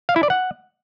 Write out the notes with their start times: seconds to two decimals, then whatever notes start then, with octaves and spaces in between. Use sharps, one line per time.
0.09 F5
0.16 E4
0.23 D5
0.30 F#5